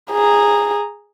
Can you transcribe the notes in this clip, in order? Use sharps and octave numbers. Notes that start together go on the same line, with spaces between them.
G#4 A#5